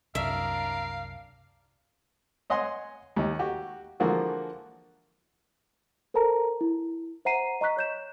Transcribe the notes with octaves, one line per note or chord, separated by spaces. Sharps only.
C2 F#2 D4 A#4 E5 F5
C#5 D#5 F#5 G#5 C6 D#6
D#2 D#4 G4
F#4 G4
D3 E3 F3 A#3 F#4 G#4
A4 A#4 C5 A5 A#5
E4
C5 E5 F#5 A#5 C7 D#7
D#5 A#5 C#6 F#6 B6
C#5 G6 E7